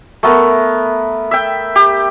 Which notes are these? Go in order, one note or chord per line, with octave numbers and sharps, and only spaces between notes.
A3 B3 A#4
E5 G5
G4